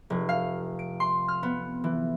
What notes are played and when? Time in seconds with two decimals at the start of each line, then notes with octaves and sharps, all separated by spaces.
0.10 F1
0.29 F5
0.79 D7
1.00 C6
1.28 F6
1.43 B3
1.84 E3